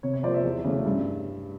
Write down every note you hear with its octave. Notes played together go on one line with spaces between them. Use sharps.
C3 C#5
C#5
F3 A#3 C5 D5
D5 E5
E2
C#3 F#3 A3
G2